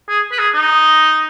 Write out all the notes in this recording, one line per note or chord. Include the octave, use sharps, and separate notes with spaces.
G#4
B4
G#4
D#4